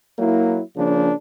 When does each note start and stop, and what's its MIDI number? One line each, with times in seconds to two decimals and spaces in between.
0.19 0.61 54
0.19 0.61 58
0.19 0.61 64
0.76 1.11 49
0.76 1.11 53
0.76 1.11 58
0.76 1.11 62